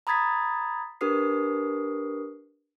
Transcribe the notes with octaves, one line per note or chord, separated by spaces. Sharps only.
A#5 B5 D#6 G#6 A6 B6
D4 G4 A#4 B4 D#6 C7